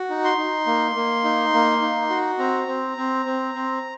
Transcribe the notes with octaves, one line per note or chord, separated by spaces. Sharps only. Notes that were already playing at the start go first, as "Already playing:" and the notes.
Already playing: F#4
D#4
C6
D#4
A#3
A#3
D#4
A#3
D#4
F#4
C4 A#5
C4
C4
C4
C4